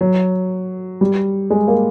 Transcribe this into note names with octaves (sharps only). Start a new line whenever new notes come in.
F#3
G3
G#3
A#3